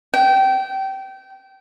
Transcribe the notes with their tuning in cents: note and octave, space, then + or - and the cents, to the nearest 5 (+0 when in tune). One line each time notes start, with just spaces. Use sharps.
G5 -20